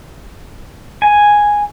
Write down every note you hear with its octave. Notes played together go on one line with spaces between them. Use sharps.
G#5